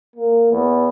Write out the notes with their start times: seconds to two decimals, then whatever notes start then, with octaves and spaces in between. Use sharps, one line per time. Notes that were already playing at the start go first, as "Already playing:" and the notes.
0.16 A#3
0.52 E2